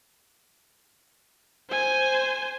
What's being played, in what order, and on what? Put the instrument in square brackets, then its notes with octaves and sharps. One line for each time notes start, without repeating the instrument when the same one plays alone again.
[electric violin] C5 G#5